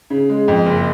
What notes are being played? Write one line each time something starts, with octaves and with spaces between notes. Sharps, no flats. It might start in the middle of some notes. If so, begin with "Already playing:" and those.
C#3
G#3
F2
F#1